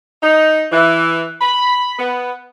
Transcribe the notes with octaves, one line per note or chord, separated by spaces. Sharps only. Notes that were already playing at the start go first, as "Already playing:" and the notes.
D#4
E3
B5
B3